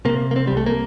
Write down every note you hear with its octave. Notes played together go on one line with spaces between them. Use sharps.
C3 A#3
A#3
C4
C2 G3
A3
A#3